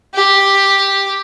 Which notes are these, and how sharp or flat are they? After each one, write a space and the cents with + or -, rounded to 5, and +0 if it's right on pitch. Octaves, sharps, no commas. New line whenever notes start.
G4 +5